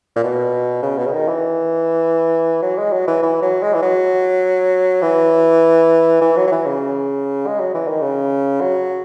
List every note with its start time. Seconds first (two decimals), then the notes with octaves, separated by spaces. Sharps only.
0.16 A#2
0.23 B2
0.82 C#3
0.98 B2
1.06 C#3
1.13 D#3
1.28 E3
2.62 F#3
2.78 G#3
2.92 F#3
3.07 E3
3.23 E3
3.42 F#3
3.62 G#3
3.74 E3
3.82 F#3
5.02 E3
6.21 E3
6.37 F#3
6.47 F#3
6.52 E3
6.66 C#3
7.47 G#3
7.60 F#3
7.74 E3
7.88 D#3
8.01 C#3
8.61 F#3